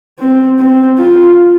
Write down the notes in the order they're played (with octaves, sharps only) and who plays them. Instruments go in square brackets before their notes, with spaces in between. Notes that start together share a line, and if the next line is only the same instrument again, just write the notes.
[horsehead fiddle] C4
C4
F4